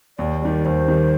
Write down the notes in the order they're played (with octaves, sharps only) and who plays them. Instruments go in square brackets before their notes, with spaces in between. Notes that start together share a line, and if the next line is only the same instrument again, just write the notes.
[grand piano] D#2 [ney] D5
[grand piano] D#3 G3 [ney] D5
[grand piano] D#2 [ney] C5
[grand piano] D#3 G3